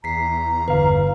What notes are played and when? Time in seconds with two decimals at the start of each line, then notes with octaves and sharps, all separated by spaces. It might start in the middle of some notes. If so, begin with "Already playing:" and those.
0.04 E2 A#5 B6 C7
0.68 G1 B4 F5